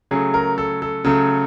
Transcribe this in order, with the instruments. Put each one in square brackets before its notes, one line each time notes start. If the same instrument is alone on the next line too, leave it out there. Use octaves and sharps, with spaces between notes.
[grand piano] C#3 F#3 A3 G#4
A#4
A4
A4
C#3 F#3 A3